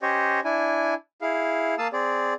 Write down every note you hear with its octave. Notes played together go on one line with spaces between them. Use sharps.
C#4 G4 C5 C#5 D#5
D4 E4 G#5
E4 G#4 F5
A#3 F5 A5 D#6 E6
C4 G#4 D5